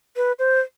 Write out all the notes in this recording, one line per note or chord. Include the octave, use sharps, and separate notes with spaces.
B4
C5